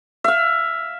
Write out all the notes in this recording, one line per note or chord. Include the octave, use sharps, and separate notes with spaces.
E5 F5